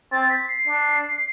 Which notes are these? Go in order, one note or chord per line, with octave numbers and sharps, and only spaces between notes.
C4 A6
B6
C7
D4